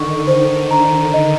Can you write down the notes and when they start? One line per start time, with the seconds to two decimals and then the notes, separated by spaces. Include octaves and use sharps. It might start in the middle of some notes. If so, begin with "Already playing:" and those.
Already playing: D3 D#3 C#6
0.27 D#3 C5
0.71 D#3 A#5
1.14 D#5